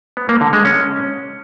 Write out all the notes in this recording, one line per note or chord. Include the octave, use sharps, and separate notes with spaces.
B3
A#3
D3
G#3
C#4